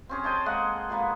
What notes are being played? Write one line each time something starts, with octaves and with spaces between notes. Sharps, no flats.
C4 C#4 G#4
C5 D#5 G5 A5
G#3 A#3 D#5 F#5
A#2 G#3 A#3 B3